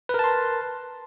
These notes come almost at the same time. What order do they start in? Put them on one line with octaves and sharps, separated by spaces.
B4 A#4 A5 C6